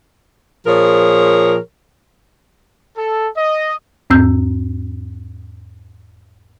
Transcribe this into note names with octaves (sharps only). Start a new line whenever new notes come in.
A#2 F3 G#4 A#4 C#5
A4
D#5
E2 G#2 C4 E6 G6